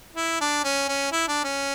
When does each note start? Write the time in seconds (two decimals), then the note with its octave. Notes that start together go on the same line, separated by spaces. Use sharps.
0.16 E4
0.41 D4
0.64 C#4
0.89 C#4
1.12 E4
1.28 D4
1.44 C#4